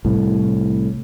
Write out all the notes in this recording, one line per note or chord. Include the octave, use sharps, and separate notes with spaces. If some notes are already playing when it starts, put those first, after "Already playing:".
C2 A2